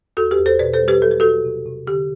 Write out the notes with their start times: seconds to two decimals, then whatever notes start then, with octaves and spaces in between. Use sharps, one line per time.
0.17 E2 F#4 A4
0.31 G4 B4
0.39 E2
0.46 A4 C5
0.59 B2 B4 D5
0.74 A4 C5
0.81 G3
0.88 G4 B4
1.02 F#3 A4
1.11 B4
1.20 F#3 F#4 A4
1.44 C3
1.66 C3
1.87 D3 G4